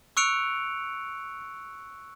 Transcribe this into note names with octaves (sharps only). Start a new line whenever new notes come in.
C#6 E6 F#6 C#7 D7 F7